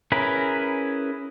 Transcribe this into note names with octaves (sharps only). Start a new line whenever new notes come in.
C#4 E4 G#4 A#4 B4